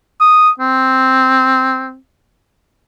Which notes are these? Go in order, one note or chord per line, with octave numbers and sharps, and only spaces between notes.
D#6
C4